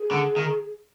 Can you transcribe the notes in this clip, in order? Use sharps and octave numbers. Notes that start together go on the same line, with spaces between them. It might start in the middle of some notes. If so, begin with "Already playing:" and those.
Already playing: G#4
D3
D#3